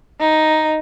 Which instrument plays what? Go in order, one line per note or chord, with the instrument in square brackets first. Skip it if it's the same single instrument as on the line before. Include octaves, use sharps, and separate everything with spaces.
[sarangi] D#4